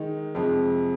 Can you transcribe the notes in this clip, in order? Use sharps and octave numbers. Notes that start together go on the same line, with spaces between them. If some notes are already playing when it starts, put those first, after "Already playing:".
Already playing: D#3 G#3 D#4
F2 C3 F3 G#3